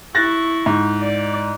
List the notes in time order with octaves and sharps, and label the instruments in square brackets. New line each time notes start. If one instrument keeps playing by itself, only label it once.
[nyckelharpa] E4 C#6 [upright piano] F#6 A6 A#6
[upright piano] G#2
[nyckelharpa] D5